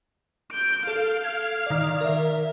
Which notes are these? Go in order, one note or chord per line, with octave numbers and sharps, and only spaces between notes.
G6 D7
A4 F5
G#6
D#3 D5
A#4 E5